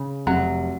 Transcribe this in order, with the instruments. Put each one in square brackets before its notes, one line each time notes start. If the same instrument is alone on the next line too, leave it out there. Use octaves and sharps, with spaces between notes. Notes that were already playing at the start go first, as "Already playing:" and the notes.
Already playing: [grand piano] C#3
[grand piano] F1 [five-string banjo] F#3